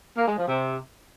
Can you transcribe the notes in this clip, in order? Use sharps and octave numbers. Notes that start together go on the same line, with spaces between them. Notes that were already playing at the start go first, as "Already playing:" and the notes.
A#3
G#3
F3
C3